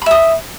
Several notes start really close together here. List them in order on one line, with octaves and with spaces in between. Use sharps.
B5 E5 D#6